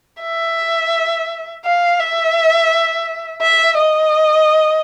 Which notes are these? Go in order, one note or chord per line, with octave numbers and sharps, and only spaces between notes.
E5
F5
E5
E5
D#5